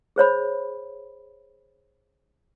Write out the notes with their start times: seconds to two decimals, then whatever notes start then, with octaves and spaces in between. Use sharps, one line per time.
0.16 G#4 C5 C#5 B5